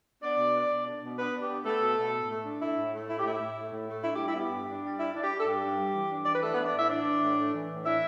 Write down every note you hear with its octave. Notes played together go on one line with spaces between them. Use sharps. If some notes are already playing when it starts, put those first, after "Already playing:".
B3 D4 D5
B2
D4
B2
D4
B2
B3 D4 B4
D4
G4
B3
A3 B3 A4
B2
B2
A2
A3
D4
A3 E4
A2
A3
A2 E4
G4
A2 E4
A2
A3
A2
A3
D4 E4
G4
G3
E4
B3 G4
G2
D4
G3
D4 E4
D4
G4
D4
A4
G2 G4
G2
G3
E3
D4
E3 D5
B4
A3 D4 A4
B3 B4
A3
D4 D5
A2 E4 E5
E3 D4 D5
E3
A2
A3
E3
A2
D4 E4 E5